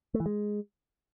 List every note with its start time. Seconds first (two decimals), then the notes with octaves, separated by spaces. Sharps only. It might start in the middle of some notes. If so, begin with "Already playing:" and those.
0.14 A3
0.20 E3
0.26 G#3